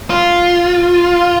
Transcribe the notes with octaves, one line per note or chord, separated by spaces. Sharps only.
F4